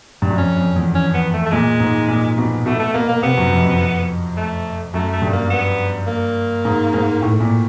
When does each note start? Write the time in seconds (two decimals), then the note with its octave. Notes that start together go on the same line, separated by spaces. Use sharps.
0.22 G2
0.30 F#2
0.38 F2 C#4
0.57 F2
0.76 E2
0.95 C#4
1.14 B3
1.33 A3
1.46 A3
1.51 A#2 G#3
1.80 G#2
2.08 A#2
2.38 B2
2.66 B2 A3
2.80 A3
2.94 B2 A#3
3.09 A#3
3.23 C3 B3
3.38 F#2
3.52 F2
3.65 F2
4.37 A3
4.94 F#2 A3
5.13 A3
5.22 G2
5.33 A#3
5.50 B3
6.07 A#3
6.65 G#2
6.94 G#2
7.22 A2
7.40 A#2